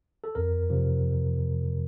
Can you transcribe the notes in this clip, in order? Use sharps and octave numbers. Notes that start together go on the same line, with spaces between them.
A4
F2 A#4
C3 F3